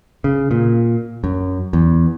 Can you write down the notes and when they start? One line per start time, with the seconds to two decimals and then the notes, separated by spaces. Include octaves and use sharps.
0.24 C#3
0.51 A#2
1.24 F#2
1.73 E2